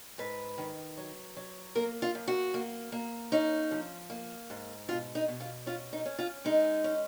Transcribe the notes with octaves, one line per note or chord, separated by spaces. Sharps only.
G#2 B4
D#3
F#3
F#3
A#3 A#4
F4
F#2
F#4
A#3
A#3
C#4 D#4
F3
A#3
G#2
B2 F4
D#4
B2
F4
C#4 F4
D#4
C#4
F4
G#3 D#4
C#4